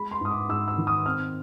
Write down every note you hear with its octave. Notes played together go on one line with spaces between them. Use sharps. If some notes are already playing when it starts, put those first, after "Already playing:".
Already playing: G#3 B5
C6
G#2 D#6
D6
G#2 E6
E6
D#3
D#6
C4 F6